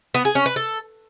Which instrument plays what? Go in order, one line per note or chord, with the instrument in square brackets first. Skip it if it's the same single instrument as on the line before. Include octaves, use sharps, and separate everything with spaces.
[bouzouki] B3
G#4
C#4
B4
A4